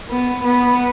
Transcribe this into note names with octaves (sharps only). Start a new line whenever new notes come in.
B3
B3